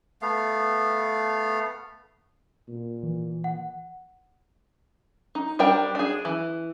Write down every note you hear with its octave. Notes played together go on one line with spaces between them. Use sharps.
A3 B3 F5
A#2
E3
F#5
D#4
G3 D4 A#4 G5
D4 G#4
E3